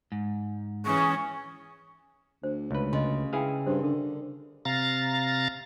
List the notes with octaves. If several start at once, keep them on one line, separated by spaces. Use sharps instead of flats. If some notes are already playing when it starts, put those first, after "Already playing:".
G#2
E3 C#4 G#4 C#6
D2 C5
C#2 B4
C#3 D#5 C6
E4 G#4 B4 F5 G5
G2 C5 C6
D3 A#4
C3 F5 A#5 A6